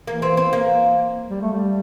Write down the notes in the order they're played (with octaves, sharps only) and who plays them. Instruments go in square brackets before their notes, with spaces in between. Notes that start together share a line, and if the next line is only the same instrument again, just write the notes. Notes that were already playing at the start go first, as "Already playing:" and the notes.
[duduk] E3 [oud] A#3
[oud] C4
C4
A#3
[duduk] G3
A3
G3